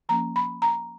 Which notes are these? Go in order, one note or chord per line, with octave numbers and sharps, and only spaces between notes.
F3 A#3 C#4 A#5
B5
A#5